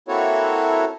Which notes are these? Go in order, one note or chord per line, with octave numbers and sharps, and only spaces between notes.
A#3 C4 E4 F#4 A4 C#5